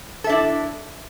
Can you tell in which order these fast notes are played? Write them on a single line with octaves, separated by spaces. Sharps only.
A4 E5 D4 E4